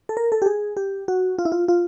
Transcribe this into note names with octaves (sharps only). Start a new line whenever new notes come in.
A4
A#4
A4
G4
G#4
G4
F#4
F4
E4
F4
F4